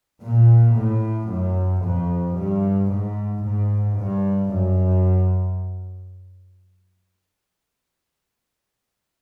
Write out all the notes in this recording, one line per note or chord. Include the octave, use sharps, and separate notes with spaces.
A#2
A2
F#2
F2
G2
G#2
G#2
G2
F#2